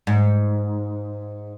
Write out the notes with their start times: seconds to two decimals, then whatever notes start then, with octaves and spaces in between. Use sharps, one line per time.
0.07 G#2